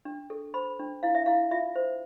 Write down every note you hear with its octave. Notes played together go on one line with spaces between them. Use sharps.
D4
A4
C5 B5
D4
E4 F5
E5
E4 F5
F4 E5
C5